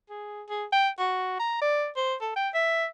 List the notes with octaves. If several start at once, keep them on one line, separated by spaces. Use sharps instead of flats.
G#4
G#4
G5
F#4
A#5
D5
C5
A4
G5
E5